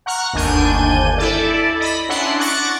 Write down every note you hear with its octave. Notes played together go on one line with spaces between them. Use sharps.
F#5 A#5 C#6 F6 F#6
G1 D#2 D4 G#5 G6 D#7
E4 A4 D5
D#5 B5
C#4 D4 E4 F#5 C6
F#5 C#6 D6 F#6 A6 A#6